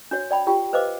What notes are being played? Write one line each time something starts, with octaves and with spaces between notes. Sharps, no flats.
D4 F#4 C#5
D5 G5 B5
F4 G4 G5
B4 C5 D#5 F5 D6